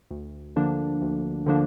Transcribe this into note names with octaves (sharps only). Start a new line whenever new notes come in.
D2
D3 F3 A#3 D4
D2
D3 F3 A#3 D4